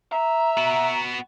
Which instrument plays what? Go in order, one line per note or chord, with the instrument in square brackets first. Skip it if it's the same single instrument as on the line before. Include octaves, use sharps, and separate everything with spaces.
[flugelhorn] E5 [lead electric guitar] A#5
[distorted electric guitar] B3 F#4